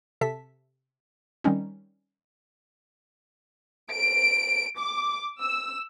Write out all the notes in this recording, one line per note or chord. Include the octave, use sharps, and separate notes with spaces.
C3 A4 E5 A5 B6
D#3 G3 C4 C#4 D#4
D7
D6
E6